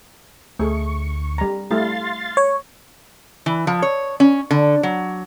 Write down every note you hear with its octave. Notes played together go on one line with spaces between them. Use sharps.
D2 A3 G#4 C#6
G3 A#5
G3 A3 E4 F5 C6 A6
C#5
E3
F3
C#5
C#4
D3
F#3